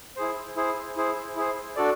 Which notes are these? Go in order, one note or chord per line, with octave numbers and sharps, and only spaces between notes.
E4 G#4 C5
E4 G#4 C5
E4 G#4 C5
E4 G#4 C5
D4 F#4 A4 D5